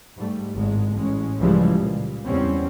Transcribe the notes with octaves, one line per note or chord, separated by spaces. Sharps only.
G#2 G3 A3
G#1 A2 G#3
A1 G#3 C#4
C#2 C#3 E3 F3 G3 G#3
A#2
E2 G3 C4 C#4